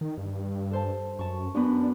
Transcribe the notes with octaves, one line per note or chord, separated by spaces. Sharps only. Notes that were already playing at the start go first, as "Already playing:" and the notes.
D#3
G2
A4 C5 A5
F#2 A5 C#6
F#2 B3 D4 B4